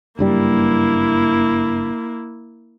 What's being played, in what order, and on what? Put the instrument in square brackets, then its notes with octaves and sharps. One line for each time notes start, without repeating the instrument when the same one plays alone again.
[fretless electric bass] F#1 G2 G3 [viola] A#3 E4